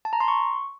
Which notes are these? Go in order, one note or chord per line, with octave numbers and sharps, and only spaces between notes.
A5
A#5
C6
C#6